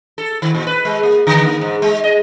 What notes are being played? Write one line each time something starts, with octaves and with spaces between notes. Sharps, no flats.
A4
D#3
A#2
B4
G#3
A#3
D3
A#3
G#2
G#3
D#5